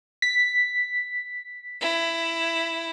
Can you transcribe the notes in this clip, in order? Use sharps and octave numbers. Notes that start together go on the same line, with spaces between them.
B6
E4